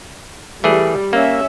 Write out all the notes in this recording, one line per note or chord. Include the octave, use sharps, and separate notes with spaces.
E3 G3 A3 G#4
A#3 C#4 E5